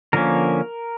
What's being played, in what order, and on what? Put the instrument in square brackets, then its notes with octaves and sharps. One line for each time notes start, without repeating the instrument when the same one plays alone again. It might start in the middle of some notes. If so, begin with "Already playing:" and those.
[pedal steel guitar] D3 F3 A#3 C#4 A#4